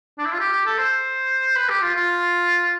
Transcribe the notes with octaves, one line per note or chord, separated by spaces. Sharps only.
D4
E4
F4
G4
G4
A4
C5
B4
G4
F4
F4